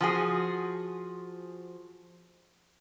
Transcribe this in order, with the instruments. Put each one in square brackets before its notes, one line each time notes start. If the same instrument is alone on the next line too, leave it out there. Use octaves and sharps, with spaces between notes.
[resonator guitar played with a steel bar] F3 F#4 G#4